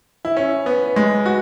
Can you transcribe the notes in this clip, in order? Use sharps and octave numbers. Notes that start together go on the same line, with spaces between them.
E4
C#4
B3
G#3
F#4